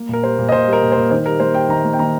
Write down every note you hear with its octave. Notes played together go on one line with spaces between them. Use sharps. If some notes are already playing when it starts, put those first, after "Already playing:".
Already playing: A#3
A#2 A#4
G3 C5
A#2
D#5
A#2 C5
G3
A#4
A#2
C5
A#2
D#3 C5
G3 A#4
A#3 C5
G3 G5
D#3 A#5
A#3
G5
D#3 A#5